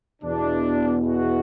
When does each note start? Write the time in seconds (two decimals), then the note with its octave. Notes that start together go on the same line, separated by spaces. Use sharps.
0.22 E2 B2 D4
1.07 F#4